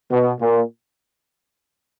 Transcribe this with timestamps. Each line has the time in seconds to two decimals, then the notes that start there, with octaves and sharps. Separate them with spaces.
0.11 B2
0.41 A#2